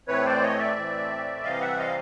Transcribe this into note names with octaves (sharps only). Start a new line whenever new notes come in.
A2 E3 A3 C4 B4 C#5
C5 D5
C#5 D#5
D5 E5
A2 E3 A3 C4
C3 E3 G3 C4 D#5 F5
E5 F#5
D#5 F5